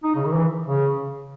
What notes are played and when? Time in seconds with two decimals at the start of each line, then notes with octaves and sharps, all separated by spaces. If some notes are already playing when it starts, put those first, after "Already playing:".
0.04 D#4
0.16 C#3
0.25 D#3
0.35 E3
0.67 C#3